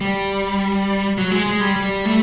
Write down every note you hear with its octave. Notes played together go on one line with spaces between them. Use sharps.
G3
F#3
G#3
G#3
G3
G3
A3